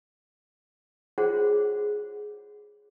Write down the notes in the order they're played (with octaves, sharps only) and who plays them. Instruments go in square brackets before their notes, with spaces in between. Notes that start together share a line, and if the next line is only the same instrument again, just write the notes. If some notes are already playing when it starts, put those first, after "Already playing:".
[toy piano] F4 F#4 G#4 C5 C#5 F#5